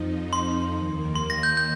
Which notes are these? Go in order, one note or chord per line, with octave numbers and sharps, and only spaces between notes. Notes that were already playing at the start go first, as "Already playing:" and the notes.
Already playing: F2 F3 D#4
C6
D#2 D#3 A#3
C6
A#6
G6
G6